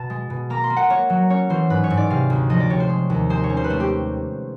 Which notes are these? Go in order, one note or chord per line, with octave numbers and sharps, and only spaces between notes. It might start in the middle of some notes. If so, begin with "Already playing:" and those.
Already playing: B2 A5
G#3
B2
A#3 A#5
C6
A#3
F#5
A#3 C#5
F#3
C#4 C#5
E3 C5
G#2 B4
C#5
G#2
D5
C3 F5
D2
F3 D#5
D5
C3 C#5
C5
G#3
D#2
G#3 C5
C#5
C#4
C5
B4
A3 C5
G4